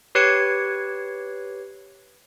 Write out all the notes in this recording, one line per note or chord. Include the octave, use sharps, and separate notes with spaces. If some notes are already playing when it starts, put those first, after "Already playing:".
G4 B4 C#5 G#6 C7 C#7